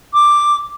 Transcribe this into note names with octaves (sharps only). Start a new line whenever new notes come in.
D6